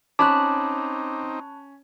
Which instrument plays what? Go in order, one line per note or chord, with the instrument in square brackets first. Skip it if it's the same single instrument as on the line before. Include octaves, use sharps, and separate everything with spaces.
[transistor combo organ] C4 D#4 [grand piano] C#4 [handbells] A5 B5 F#6 [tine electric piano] D6